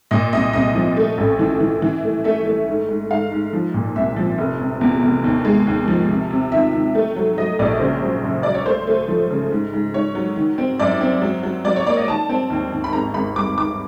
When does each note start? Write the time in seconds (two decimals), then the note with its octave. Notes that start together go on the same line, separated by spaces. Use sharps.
0.11 A#2 D#5
0.33 C2 D#5
0.53 C2 D#5
0.75 F3
0.97 A3
1.18 A1
1.39 E3
1.60 E3
1.82 E3
2.04 A3
2.24 A3 E5
2.46 A3
2.68 G#2
2.88 G#2
3.10 G#2 F5
3.32 G#2
3.53 F3
3.74 A#2
3.96 C2 E5
4.16 F3
4.38 F1
4.60 C3
4.81 E2
5.03 F1
5.24 D#2
5.45 G#3
5.67 D#2
5.88 F3
6.10 C3
6.31 C3
6.52 D#3 E5
6.73 D#3
6.95 A3
7.16 F#3
7.37 F#3 D#5
7.59 A#1 D5
7.80 C#3 C5
8.02 F#3
8.23 F#2
8.43 F#3 D5
8.54 C#5
8.66 A3 C5
8.87 A3
9.08 F3
9.30 C#3
9.51 G#2
9.73 G#2
9.94 G#2 C#5
10.15 F#3
10.36 D#3
10.58 C4
10.79 F#2 D5
11.01 C4
11.22 F#3
11.43 F#3
11.65 F#3 D5
11.76 C#5
11.87 A#3 D5
11.97 D#5
12.08 D#3 A5
12.29 C4
12.50 D#2
12.72 D#2
12.84 B5
12.93 G#1 A#5
13.14 G#1 B5
13.36 G2 D6
13.57 D#3 D6